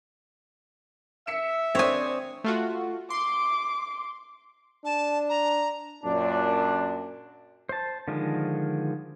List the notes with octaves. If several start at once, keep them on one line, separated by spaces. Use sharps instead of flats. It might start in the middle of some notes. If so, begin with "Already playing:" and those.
E5 B6 C#7 E7
C4 D4 C5 C#5 G#5 D#6
A3 F4 F#4
C6 D6
D4 A5
A#5
F#2 A#2 D4
C5 A5
D3 D#3 F3 G#3